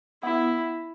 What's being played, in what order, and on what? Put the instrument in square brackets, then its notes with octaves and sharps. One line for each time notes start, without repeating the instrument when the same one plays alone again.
[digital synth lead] B3 [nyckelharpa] E4